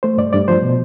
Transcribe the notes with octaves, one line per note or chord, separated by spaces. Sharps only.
A3 C5
G2 D5
G2 D5
F3 C5
B2